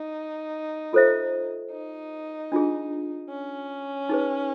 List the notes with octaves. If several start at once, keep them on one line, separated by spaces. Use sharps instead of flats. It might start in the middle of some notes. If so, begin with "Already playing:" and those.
Already playing: D#4
F4 A4 C5 E5
D#4
D4 F4 G#4
C#4
D#4 G#4 B4